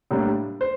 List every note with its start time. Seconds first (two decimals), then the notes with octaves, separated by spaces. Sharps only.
0.11 A2 G3 A#3 D4
0.61 C5